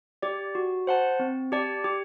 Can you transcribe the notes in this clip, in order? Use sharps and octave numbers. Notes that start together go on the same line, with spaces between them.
G4 D5
F#4
C5 F#5 A5
C4
G4 D5 A5
G4